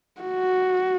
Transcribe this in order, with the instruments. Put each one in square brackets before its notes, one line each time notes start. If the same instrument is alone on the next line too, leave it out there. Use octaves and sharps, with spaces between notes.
[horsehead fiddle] F#4